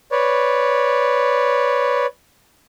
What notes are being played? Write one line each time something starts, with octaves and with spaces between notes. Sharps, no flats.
B4 C#5 D5